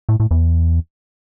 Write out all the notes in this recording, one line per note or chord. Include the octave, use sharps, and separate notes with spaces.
A2
A2
E2